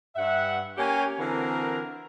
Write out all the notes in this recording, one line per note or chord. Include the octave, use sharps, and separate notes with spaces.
G2 E5 F#5
A#3 C#4 G4 C#5 G5 G#5
D3 E3 C4 F#4 A#4